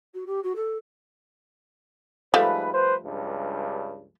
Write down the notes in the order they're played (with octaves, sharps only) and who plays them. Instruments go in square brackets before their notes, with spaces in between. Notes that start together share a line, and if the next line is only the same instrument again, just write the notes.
[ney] F#4
G4
F#4
A4
[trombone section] G#2 B4 [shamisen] F3 G3 A3
[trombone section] B4 C5
C#2 G2